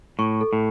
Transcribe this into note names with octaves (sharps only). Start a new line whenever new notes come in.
A2 C#6
A4
A2